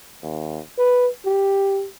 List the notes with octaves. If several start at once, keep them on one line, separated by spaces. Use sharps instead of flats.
D#2
B4
G4